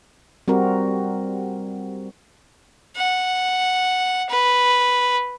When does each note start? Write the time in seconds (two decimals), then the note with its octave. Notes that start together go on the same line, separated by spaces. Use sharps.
0.48 G3 C4 F#4 A#4
2.96 F#5
4.29 B4